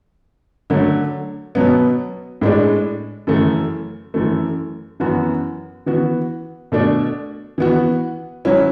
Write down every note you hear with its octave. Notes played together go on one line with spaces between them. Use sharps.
D3 F#3 A3
B2 F#3 B3
A2 G#3 D4
F#2 C#3 E3 A3
F#2 E3 A3
F#2 E3 B3 F#4
E3 B3 F#4
B2 A3 D4
E3 B3 F#4
F#3 C#4 E4